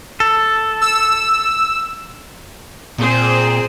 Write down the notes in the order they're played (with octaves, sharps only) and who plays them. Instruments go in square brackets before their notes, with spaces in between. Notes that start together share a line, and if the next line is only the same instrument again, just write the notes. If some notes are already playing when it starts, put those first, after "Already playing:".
[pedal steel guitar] A4
[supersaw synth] E6
[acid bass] A#2 [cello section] C4 G#4 C5